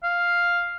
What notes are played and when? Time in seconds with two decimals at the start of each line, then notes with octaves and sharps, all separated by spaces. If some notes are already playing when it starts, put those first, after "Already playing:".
0.03 F5